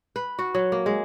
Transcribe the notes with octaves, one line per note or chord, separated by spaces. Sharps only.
B4
F#4
F#3
A#3
G#3